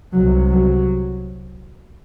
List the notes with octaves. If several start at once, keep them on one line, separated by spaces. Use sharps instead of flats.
C2 C3 F#3
F#3